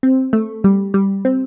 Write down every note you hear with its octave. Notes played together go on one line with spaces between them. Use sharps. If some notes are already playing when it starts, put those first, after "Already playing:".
C4
A3
G3
G3
C4